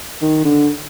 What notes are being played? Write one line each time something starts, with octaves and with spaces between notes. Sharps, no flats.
D#3
D3